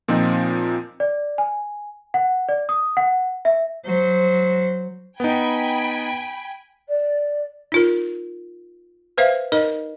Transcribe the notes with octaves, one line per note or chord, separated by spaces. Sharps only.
A#2 F3 C4 D#4
D5
G#5
F#5
D5
D#6
F#5
E5
F#3 C5
B3 D#4 G5 G#5 B5
D5
D#4 F4 A#4
B4 C5 E5 F5
D#4 A#4 D#5